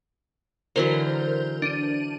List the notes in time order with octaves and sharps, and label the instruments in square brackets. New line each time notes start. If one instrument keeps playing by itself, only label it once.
[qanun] D3 E3 F#3 [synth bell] A#4 C5
[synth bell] D4 D#7